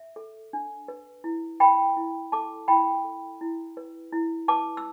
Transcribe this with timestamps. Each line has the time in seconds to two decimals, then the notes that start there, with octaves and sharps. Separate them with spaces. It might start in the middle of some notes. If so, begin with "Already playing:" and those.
Already playing: E5
0.16 A4
0.53 D4
0.88 B4
1.24 E4
1.60 B4 G5 B5
1.97 E4
2.32 A4 A5 D6
2.68 E4 G5 B5
3.04 A4
3.41 E4
3.77 B4
4.12 E4
4.48 B4 A5 D6
4.77 E6